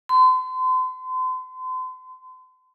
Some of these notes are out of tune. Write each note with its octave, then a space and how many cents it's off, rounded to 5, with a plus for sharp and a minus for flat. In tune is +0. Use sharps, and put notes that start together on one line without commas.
C6 -40